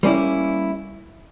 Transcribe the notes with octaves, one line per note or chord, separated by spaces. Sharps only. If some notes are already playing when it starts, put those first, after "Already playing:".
G3 A#3 C#4 E4